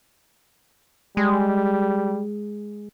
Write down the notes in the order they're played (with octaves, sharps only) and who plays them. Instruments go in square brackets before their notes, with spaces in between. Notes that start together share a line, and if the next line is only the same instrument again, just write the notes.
[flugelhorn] G3 [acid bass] G#3